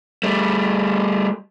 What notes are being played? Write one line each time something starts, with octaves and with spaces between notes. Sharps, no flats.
G3 A3